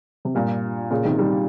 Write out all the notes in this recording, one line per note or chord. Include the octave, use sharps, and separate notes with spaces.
C3
G2 A#2
A#2 C#3
C3 D#3
D#3 G3